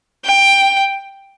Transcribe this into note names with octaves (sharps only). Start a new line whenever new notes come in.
G5